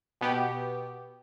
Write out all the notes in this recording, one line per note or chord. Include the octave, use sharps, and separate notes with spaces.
B2 B3 G4